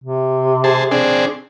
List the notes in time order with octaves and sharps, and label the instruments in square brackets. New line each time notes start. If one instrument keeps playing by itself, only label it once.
[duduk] C3
[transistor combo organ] G#4 C5 A5
C4 D4 G#4